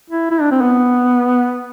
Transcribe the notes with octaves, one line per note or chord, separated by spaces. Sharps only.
E4
E4
D4
C4
B3